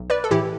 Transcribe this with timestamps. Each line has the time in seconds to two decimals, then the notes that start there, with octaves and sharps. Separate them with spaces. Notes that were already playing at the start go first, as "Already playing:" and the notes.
Already playing: B1
0.10 B4 D5
0.24 A4
0.31 A2 E3 E4 G4